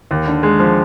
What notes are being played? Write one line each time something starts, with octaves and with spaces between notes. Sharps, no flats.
D#2
D3
G#3
F3